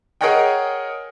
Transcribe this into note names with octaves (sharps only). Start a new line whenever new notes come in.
G#4 A#4 C#5 D#5 F#5 G5